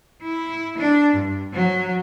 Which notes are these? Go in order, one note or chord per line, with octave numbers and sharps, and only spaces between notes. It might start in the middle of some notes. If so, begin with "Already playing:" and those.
E4
D4
G2
F#3